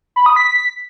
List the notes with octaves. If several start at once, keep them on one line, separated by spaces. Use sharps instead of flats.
B5
D#6
B6